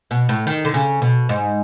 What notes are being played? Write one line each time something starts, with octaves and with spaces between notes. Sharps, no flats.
B2
A2
D#3
D3
C#3
B2
G#2